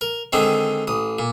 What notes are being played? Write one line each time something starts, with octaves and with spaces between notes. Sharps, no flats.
A#4
D3 D#3 G#3 C4
A1 D#6
A#2